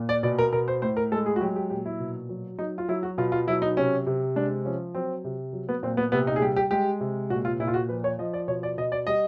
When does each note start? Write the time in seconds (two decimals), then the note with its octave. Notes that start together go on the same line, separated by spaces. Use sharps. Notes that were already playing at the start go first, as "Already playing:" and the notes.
Already playing: A#2
0.09 D5
0.23 B2 D5
0.39 A#4
0.52 B2 A#4
0.68 C5
0.82 A2 C5
0.97 A#4
1.12 G#3 A4
1.26 G#4
1.36 F#4
1.41 F#3 G4
1.56 G4
1.70 A#2 G4
1.86 E4
2.00 B2
2.29 F#3
2.59 F#3 D#4
2.78 F4
2.88 F#3 E4
3.03 F#4
3.18 B2 F4
3.32 F4
3.47 F#3 E4
3.62 D#4
3.77 C3 C#4
4.07 C3
4.36 G#3 D4
4.65 F3 C#4
4.95 F#3 C4
5.24 C3
5.53 F#3
5.69 B3
5.83 A#2 C4
5.97 B3
6.12 C3 B3
6.27 D#4
6.36 G#4
6.41 G3 G4
6.56 G4
6.71 G#3 G4
7.01 C3
7.30 A#2 F#4
7.45 F4
7.60 A#2 E4
7.68 F4
7.74 F#4
7.89 F3 B4
8.04 C#5
8.19 F3 D#5
8.33 D5
8.48 B2 C#5
8.63 D5
8.77 B2 D#5
8.92 D5
9.07 G3 D#5